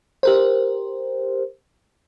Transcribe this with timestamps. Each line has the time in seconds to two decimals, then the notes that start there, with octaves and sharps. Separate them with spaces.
0.23 G4 A#4 C5